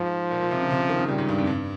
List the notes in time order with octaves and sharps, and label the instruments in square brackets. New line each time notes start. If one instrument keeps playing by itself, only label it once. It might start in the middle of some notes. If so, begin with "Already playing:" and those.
Already playing: [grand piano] G#2 [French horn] F3
[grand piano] A#2
A#2
C3
C#3
C3
C#3
D#3
C#3
[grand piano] A#2 [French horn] G3
[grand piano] G#2
G2
F2
G2